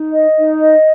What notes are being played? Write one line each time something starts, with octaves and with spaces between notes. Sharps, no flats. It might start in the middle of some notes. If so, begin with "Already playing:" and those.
Already playing: D#4
D#5
D#4
D#5